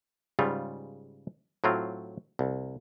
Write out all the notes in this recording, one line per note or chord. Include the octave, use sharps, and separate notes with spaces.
G#2 C#3 G3 F4
A2 F#3 C4 F4
C2